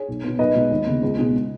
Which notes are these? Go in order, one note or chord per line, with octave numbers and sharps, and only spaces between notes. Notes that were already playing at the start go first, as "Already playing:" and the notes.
Already playing: G#4 C#5
B1
B2 B3
B1 B4 D#5
B2 G#3
D#2
C#3 B3
C#2
B2 G#3 B3